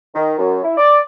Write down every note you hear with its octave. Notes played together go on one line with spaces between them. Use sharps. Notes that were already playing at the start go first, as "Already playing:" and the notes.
D#3
F#2
E4
D5